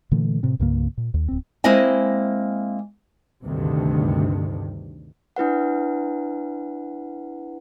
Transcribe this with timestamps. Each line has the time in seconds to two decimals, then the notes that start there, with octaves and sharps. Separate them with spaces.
0.11 A#2 D3 E3 A3
0.43 A2 C3 C4
0.59 C2 G2 C#3 A#3
0.97 A#2
1.14 D#2
1.28 D1 C4
1.64 G#3 A#3 C4 E4 D#5 G#5
3.44 D2 G2 C3 D#3
5.36 D4 E4 B4 F#5